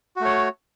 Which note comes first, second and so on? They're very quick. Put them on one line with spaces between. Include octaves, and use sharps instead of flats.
F#4 A3 C#5